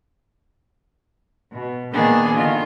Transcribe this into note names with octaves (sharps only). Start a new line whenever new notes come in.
B2
A#2 D#3 A#3 B3 D4 G#4
D3 D#3 F4